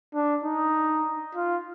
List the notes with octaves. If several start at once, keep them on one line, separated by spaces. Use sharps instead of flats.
D4
D#4
F4